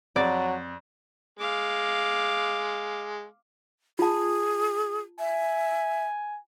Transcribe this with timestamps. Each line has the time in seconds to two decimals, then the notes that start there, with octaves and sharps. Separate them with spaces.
0.16 F2 F#3 D5
1.39 G#3 F5 D6
3.99 F4 G#4 A5
5.19 E5 G#5